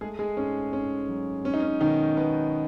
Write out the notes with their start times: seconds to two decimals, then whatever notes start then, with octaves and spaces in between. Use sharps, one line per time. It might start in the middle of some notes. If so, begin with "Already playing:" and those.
0.01 G#3 A3 G#4
0.19 G#3 G#4
0.37 G#2 C#4
0.73 G#2 C#4
1.09 F#3
1.45 G#3 C#4
1.54 D#4
1.62 C#4
1.81 B2 D#3 D#4
2.17 B2 B3